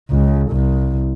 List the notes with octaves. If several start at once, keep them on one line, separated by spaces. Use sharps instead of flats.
C#2
C2